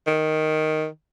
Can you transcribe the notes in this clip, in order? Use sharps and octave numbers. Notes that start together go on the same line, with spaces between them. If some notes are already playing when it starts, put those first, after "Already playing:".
D#3